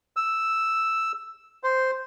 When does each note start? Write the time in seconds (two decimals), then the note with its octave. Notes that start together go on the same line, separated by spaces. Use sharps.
0.16 E6
1.63 C5